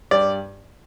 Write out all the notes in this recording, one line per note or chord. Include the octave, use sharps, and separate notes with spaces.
G2 D5